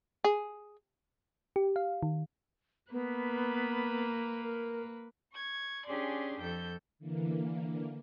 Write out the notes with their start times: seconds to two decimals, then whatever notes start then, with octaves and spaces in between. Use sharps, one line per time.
0.24 G#4
1.56 G4
1.76 F5
2.03 D#3
2.92 A#3 B3 B4
4.43 A#4
5.32 C#6 G#6
5.86 C#4 D4 G4 G#4 D5 C6
6.40 F2 A4 G5 G6
6.99 D3 E3 A#3